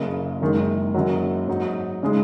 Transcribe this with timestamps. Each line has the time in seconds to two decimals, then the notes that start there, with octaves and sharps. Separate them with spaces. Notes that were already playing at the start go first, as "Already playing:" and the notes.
Already playing: F#1 F#2 C#3
0.41 F#1 F#2 D#3 G#3
0.94 F#1 F#2 D#3 F#3
1.48 G#2 F#3 D#4
2.03 C#3 G#3 D#4